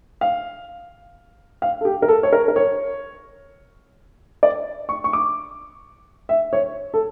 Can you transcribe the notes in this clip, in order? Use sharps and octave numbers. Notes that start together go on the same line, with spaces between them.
F5
F5
A4
G4
A#4
A4
C#5
A#4
A#4
C#5
D5
C#6
C#6
D6
E5
C#5
A4